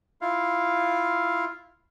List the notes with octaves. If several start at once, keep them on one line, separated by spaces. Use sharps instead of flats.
E4 F4 F5